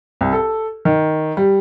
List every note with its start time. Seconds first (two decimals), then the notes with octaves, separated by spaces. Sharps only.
0.21 C2
0.33 A4
0.85 D#3
1.37 G3